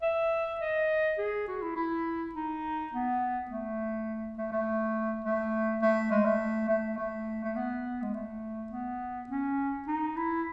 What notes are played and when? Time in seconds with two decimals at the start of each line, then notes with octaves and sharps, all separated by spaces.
0.02 E5
0.60 D#5
1.18 G#4
1.47 F#4
1.62 E4
1.76 E4
2.34 D#4
2.92 B3
3.50 A3
4.37 A3
4.52 A3
5.24 A3
5.82 A3
6.11 G#3
6.25 A3
6.69 A3
6.97 A3
7.44 A3
7.56 B3
8.02 G#3
8.14 A3
8.72 B3
9.29 C#4
9.88 D#4
10.16 E4